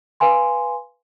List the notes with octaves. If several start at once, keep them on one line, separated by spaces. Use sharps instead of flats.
B4 F5 G#5 C6